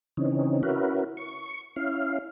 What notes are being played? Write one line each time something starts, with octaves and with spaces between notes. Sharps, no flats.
C#3 E3 C4 C#4 D#4
C#4 E4 F#4 A#4 B4
C#6
C#4 E4 F5